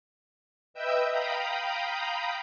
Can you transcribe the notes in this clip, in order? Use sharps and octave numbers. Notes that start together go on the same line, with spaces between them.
B4 D#5 E5 G5 E6 G6
F5 G5 A#5 B5 D#6 G6